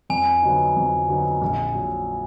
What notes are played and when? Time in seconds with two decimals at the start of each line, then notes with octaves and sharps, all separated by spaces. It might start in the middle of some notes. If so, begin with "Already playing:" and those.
0.10 F2 G#5
0.42 D3 F#3 B3 D#4
0.77 F2
1.08 D3 F#3 B3 D#4
1.42 A#1
1.74 A#2 F#3